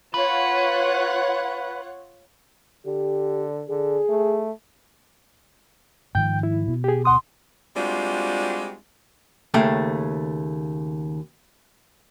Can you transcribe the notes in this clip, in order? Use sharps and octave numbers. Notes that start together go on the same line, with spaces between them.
F4 B4 C#5 F#5
D3 G4
D3 G#4
A3
G#2 D#3 F3 G5 G6
E4
B2
G4 G#4
D2 F#5 C6 D#6
G3 G#3 C4 D4 F4 F#4
D#2 C#3 A3 G5